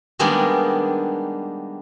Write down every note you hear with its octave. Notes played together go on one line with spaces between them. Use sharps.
D#3 G3 G#3 A#3 B3 D4